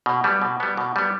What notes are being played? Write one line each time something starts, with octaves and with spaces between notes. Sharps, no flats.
B2
G3 B3
B2
G3 B3
B2
G3 B3